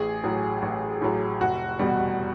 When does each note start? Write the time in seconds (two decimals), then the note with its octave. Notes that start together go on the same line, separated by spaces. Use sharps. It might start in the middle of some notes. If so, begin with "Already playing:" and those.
Already playing: A1 G#4
0.24 A2 F#3
0.62 A1
1.02 A2 F#3
1.40 F1 F#4
1.79 E2 B2 G3